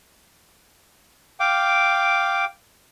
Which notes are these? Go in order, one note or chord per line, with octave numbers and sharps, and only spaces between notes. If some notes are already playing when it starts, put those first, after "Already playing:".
F5 G5 D6